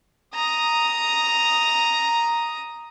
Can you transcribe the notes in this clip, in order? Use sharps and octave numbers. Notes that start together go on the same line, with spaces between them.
A#5 D#6